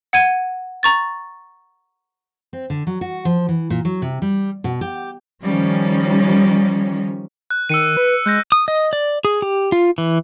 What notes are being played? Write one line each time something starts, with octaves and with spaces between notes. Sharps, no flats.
F#5 G#6 D#7
A#5 C#6 A6
C4
D3
F#3
F#4
F3
E3
A#2
F#3
C3
G3
B2
G4
D#3 F3 G3 C#4
F#6
D#3 E6 C#7 D#7
B4
G#3 F#6 G6 A#6
D#6
D#5
D5
G#4
G4
F4
E3